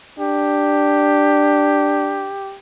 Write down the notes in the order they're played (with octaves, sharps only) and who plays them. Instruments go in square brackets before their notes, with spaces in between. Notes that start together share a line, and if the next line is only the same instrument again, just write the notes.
[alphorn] D4 [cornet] G4